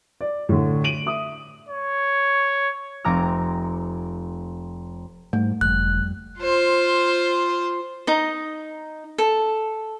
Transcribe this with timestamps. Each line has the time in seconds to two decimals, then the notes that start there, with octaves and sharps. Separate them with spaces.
0.21 D5
0.49 A2 D3
0.84 D7 D#7 F#7
1.06 E5 D#6
1.69 C#5
3.04 F1 C4 A#5 D6 F6
5.33 G#2 G3 A3
5.61 F#1 F2 G3 F#6
6.40 F4 C5
8.07 D#4 D#5
9.18 A4